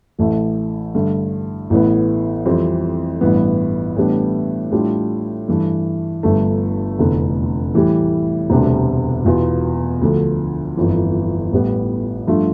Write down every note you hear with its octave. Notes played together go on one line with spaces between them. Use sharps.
A1 A2 E3 A3 E4
G2 D3 A3
A1 A2 E3 B3
F2 E3 G3 C4
A1 G2 E3 B3
A2 E3 G3 B3 D4
A2 G3 D4 F4
G2 E3 A3
G1 G2 D3 A3
F1 E2 D3
A2 E3 G3
E1 D2 C3 G3 D4
E1 E2 B2 B3 F4
D2 D3 F3
G1 F2 E3
A1 A2 G3 B3
G2 F3 A3 D4 F4